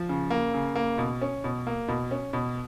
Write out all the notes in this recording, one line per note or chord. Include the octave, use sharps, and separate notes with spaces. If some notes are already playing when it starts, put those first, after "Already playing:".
Already playing: F3
C#3
A#3
C#3
A#3
B2
C#4
B2
A#3
B2
C#4
B2